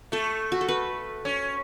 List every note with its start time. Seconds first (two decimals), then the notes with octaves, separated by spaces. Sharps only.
0.12 A3 A4
0.52 F#4
0.61 A4
0.68 B4
1.25 C#4